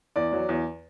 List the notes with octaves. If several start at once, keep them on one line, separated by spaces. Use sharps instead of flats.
E2 D5
F#3
E2